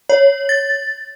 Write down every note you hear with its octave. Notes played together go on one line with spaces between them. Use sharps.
C#5
A6